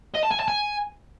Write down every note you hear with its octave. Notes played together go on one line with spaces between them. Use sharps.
D#5
A5
G#5
A5
G#5